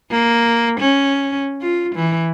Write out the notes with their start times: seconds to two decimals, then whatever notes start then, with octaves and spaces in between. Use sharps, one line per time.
0.11 A#3
0.80 C#4
1.62 F4
1.95 E3